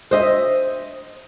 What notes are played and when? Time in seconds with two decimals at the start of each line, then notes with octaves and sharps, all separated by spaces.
0.11 C5 D#5 E5